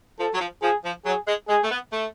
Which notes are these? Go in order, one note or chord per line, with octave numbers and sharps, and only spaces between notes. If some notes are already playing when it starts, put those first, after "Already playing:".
F3 A4
F#3
F3
F3 G#4
F3
F#3 G#4
G#3
G#3 G#4
A3
B3
A3